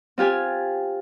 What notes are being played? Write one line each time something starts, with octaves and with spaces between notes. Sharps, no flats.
C4 F4 G4 G#5